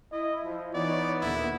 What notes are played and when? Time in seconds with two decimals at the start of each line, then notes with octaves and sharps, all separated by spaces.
0.11 E4 D#5
0.44 F3
0.74 E3 B3 D#4 C#5 D5
1.21 D#2 A#2 D3 E4